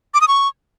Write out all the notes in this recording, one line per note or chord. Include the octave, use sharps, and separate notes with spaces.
D6
D#6
C#6